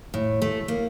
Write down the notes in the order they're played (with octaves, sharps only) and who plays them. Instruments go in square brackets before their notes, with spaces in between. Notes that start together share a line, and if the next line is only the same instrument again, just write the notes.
[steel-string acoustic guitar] A2
A3
A#3